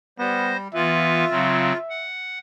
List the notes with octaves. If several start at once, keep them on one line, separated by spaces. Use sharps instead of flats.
G3 B3 C5 A#6
E3 B3 F4 B4 E5
C#3 F#3 C4
F#5